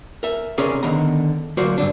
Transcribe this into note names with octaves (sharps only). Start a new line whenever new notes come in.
A#4 E5
C3 C#4 G#4 A#4 D5
D3 D#3 B3 A#5
D2 F#3 A#3 F#4 C5 D5
G2 B2 D3 D4